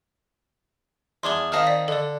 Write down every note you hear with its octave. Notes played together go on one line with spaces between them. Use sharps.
E2 D4 G#5 C6 D6 G7
D#3 C4 D#5 F5 A5 F6
D5 B6
D3 A4 D5